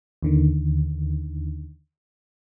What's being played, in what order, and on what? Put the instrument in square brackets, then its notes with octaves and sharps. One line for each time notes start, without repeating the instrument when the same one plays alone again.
[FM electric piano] D#2 D3 D#3